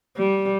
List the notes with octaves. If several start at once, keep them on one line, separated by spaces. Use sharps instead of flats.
G3